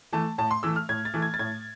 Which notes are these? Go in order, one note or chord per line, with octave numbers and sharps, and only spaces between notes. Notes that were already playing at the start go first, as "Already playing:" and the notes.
E3 A3 A5
A2 A5
C6
E3 A3 E6
F6
A2 G#6
A6
E3 A3
G#6
A6
A2 G#6